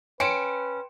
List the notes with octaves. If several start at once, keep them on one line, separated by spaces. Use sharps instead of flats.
C#4 B4 G5 C6 C#7 D7 E7